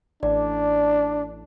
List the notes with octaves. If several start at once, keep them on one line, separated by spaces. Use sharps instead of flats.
A1 D4 D5